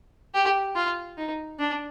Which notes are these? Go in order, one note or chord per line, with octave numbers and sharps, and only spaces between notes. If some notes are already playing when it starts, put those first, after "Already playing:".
G4
F4
D#4
D4